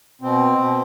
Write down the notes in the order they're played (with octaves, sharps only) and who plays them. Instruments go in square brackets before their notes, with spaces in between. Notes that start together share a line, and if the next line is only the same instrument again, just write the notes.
[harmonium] B2 C4
B2